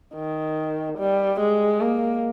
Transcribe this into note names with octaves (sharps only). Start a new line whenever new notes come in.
D#3
G3
G#3
A#3